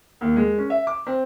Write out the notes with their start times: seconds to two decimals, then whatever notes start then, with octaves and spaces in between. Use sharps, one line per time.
0.21 D#2
0.36 G#3
0.58 C#4
0.70 E5
0.87 D6
1.07 C4